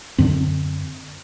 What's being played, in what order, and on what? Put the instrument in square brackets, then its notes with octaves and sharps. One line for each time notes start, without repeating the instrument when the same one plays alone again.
[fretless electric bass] F#2 D3 C4